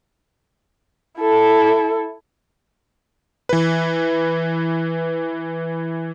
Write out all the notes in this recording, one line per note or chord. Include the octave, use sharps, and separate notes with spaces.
E4 A4
E3 B4